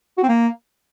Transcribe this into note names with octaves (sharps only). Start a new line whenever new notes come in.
F#4
C4
A#3